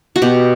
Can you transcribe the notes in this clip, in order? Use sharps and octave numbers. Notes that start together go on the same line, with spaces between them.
F#4
B2 G4